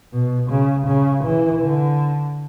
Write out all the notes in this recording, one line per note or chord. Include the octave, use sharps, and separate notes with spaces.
B2
C#3
C#3
E3
D3